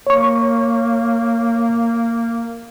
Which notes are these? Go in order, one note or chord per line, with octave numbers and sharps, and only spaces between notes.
A#3 C#5 C#6